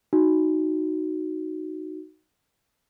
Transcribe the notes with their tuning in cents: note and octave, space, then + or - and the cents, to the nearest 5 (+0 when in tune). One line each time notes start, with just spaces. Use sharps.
D#4 +0 F#4 +0